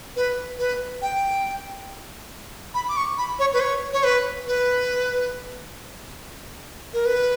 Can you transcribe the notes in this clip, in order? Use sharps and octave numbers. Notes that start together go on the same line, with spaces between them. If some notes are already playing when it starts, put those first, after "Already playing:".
B4
B4
G5
B5
D6
C#6
B5
C#5
B4
C#5
C#5
B4
B4
A#4
B4